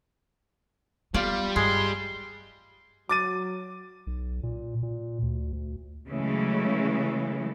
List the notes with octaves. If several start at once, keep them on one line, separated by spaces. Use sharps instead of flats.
G3 B3 F4 D5
G2 G#3 C6
F#3 D6 A6 D#7
B1
A#2
A#2
D2
D2
C#3 E3 F#3 G#3 A3